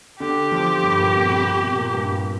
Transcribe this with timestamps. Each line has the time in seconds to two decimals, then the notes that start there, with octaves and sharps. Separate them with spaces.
0.20 D3 G4
0.52 F3
0.83 G2
1.00 A#2
1.15 C3
1.31 C3
1.46 A#2
1.62 C3
1.78 A#2
1.94 G2